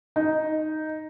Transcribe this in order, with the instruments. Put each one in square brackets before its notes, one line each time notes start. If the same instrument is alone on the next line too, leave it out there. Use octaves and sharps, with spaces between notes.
[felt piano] D#4